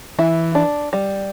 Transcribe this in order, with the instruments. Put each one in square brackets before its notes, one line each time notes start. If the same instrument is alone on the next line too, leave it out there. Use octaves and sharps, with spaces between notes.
[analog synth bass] E3 [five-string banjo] E4
[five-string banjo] D4
G3